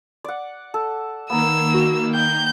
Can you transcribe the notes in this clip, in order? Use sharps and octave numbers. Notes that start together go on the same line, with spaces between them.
D5 F#5
A4
D#3 A#3 B3 A#5 E6
F#4
G5 G6